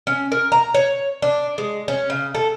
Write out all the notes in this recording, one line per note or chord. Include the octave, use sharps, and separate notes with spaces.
C#4
A#4
A#5
C#5
D4
G#3
C#4
C#3
A4